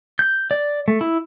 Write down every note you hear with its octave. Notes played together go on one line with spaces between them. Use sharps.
G6
D5
A3
E4